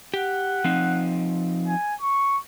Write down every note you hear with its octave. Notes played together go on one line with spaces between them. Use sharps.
G4 F#5
F3 C4 D#4
G#5
C#6